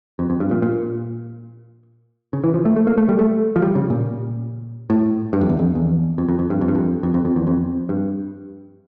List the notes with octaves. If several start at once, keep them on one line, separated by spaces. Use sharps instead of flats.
F2
F2
G2
A#2
A#2
C#3
E3
F3
A3
A3
A#3
A3
G3
A3
F3
G3
C#3
A#2
A2
G2
F2
E2
F2
E2
F2
F2
F2
G2
F2
G2
F2
F2
F2
F2
E2
F2
G2